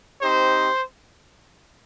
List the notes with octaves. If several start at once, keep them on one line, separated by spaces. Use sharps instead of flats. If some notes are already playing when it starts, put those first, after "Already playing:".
C4 D#4 G4 C5